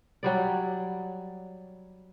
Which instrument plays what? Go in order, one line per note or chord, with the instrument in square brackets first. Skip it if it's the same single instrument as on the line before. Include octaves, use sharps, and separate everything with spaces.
[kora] F#3 G3 D5